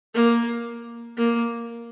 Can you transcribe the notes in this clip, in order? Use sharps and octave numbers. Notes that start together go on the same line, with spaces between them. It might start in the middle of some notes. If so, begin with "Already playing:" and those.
A#3
A#3